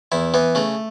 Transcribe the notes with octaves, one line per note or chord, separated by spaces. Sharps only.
E2 E4
E3 B3
C#3 A3